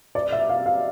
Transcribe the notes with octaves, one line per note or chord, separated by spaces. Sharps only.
D5
E5
F5
F5